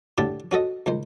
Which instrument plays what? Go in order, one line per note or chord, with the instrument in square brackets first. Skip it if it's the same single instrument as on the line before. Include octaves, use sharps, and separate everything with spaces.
[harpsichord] A2 D3 D4 E4 G4 A5
C#4 F#4 A4 D#5
C#2 D#3 C5